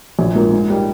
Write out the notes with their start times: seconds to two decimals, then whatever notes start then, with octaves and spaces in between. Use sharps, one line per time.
0.19 A#1
0.35 G#2 F3 A#3
0.52 G#2
0.70 G3 A#3 D#4 G4